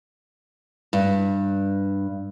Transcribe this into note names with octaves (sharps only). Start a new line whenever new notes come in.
G2